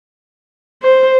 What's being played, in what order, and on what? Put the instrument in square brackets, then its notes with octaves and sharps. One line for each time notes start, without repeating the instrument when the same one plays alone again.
[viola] C5